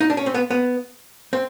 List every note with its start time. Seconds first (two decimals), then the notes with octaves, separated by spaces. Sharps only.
0.01 D#4
0.10 D4
0.17 C#4
0.26 C4
0.35 B3
0.50 B3
1.33 C4